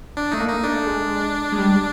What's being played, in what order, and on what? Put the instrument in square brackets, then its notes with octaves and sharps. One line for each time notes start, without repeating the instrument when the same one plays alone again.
[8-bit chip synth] D4
[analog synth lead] A3 [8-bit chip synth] D#4
[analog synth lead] A#3
[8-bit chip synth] D#4
[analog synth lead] A3 [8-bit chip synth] D4
[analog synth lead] G#3
G#3
G3